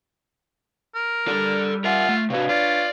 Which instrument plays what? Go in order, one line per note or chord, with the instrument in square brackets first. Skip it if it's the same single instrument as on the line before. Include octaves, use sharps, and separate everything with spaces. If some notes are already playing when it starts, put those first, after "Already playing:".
[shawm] A#4
[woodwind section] G3 [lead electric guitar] A4 D5
[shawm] F4 [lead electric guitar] A#4 E5 [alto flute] F#5
[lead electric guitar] A3
[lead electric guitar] C3 F#4 [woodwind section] D4 B4 C#5 [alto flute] F5
[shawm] F4 [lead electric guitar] D5